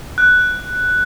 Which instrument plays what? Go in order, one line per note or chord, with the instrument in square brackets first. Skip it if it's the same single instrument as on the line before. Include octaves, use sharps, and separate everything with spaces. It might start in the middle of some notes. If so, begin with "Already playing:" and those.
[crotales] F#6